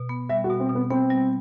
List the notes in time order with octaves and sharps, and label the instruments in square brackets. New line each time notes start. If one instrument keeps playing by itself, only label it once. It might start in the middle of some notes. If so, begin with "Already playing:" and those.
Already playing: [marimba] B2
B3
[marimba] G3 [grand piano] E5
[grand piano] F#4
[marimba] B2
[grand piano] C4
[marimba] B2
[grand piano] B3
[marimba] B3 [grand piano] C4
[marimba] G3